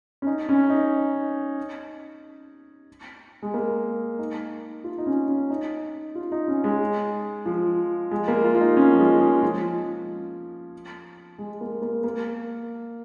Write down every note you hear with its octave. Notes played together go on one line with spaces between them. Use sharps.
C#4
D#4
C#4
D#4
G#3
A#3
D#4
F4
D#4
C#4
C#4
D#4
F4
D#4
C#4
G#3
F3
G#3
A#3
F4
F4
D#4
C#4
F3
G#3
G#3
F3
G#3
A#3
A#3
A#3